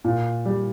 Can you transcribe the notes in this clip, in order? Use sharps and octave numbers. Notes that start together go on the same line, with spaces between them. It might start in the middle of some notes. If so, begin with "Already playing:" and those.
A#2
G3